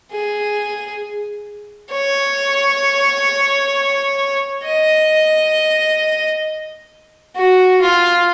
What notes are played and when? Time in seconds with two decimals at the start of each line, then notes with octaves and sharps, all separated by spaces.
0.12 G#4
1.93 C#5
4.65 D#5
7.36 F#4
7.82 F4